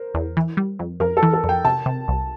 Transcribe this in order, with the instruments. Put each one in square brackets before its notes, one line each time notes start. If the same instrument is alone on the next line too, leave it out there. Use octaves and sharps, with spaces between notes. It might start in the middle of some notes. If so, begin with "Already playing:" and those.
Already playing: [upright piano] A#4 C5
[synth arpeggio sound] E2
E3
G3
F2
[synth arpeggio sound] F2 [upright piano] A#4
[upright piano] A4
[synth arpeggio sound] E3
[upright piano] A4
[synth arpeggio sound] F2
[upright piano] G5
[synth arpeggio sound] C3 [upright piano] A5
[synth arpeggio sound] C3
C2